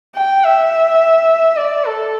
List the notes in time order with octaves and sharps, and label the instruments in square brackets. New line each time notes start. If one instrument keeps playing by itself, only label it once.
[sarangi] G5
E5
D5
A4